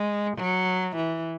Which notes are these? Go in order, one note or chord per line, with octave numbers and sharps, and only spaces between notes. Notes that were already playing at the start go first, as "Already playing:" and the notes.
Already playing: G#3
F#3
E3